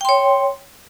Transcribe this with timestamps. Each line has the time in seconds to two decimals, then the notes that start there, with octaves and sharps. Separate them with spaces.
0.01 G5
0.05 C6
0.09 C#5